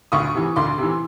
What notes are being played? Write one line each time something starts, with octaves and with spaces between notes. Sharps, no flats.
D2 C#6 D#6
C3 E3
D2 C6 D6
C3 E3